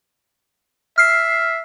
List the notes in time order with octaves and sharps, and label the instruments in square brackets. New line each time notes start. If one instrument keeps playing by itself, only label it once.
[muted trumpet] E5 [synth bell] F6 C7